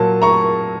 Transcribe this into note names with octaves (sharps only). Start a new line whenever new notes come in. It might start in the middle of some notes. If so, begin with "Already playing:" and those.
Already playing: A#2 F#3 A#3 A5
A#5 C#6